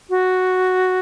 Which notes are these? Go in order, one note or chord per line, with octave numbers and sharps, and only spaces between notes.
F#4